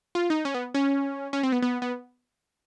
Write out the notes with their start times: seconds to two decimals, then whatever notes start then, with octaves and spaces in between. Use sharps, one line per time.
0.15 F4
0.30 D#4
0.45 C#4
0.54 B3
0.74 C#4
1.33 C#4
1.43 C4
1.52 B3
1.62 B3
1.82 B3